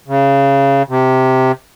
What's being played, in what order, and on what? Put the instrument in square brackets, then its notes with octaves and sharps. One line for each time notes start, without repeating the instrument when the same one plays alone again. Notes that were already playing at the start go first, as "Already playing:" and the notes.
[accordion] C#3
C3